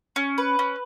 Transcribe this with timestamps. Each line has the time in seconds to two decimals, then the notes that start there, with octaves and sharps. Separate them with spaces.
0.16 C#4
0.38 B4
0.59 C#4